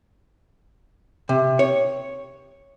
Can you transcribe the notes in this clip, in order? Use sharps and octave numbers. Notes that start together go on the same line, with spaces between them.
C3
C#5